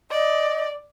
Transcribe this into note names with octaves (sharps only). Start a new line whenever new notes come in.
D5 D#5